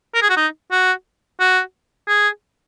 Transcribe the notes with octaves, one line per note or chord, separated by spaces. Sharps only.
A#4
G#4
F#4
D#4
F#4
F#4
G#4